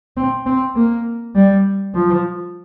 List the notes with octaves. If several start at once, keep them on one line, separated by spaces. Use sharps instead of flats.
C4
C4
A#3
G3
F3